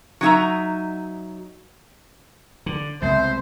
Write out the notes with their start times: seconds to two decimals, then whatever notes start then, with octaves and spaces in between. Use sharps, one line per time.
0.21 F#3 D#4 E5 A#5
2.66 D3
3.02 C2 C#3 G#3 B3 C5 E5